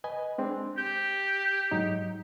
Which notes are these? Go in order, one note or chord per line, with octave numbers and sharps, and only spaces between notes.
B4 D#5 G#5
G#3 C4 D4
G4 G6
G#2 F#3 D#4